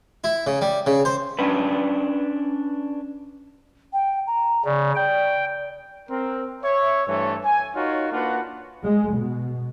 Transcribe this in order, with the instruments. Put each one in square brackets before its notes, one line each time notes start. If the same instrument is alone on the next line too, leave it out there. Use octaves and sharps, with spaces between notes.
[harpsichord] E4
C#3
G3
C#3
C5
[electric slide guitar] C#4 D4 B4
[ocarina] G5
A#5
[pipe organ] C#3 [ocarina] D5
[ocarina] D5 [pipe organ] G5
[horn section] C4 A#4
C#5 E5
G2 E3 A3 A4 C5 C#5
G#5
D#4 F4 F#4 A#4 C#5
A#3 D4 F4 F#4 B4 F#5
[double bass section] G#3
B2